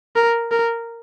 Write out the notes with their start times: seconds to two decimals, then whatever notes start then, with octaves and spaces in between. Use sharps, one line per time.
0.16 A#4
0.52 A#4